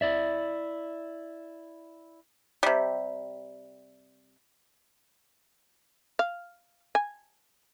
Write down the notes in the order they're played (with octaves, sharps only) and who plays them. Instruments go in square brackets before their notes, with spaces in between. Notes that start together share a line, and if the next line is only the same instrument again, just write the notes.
[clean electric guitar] E4 D5 E5
[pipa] C3 G3
[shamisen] F5
G#5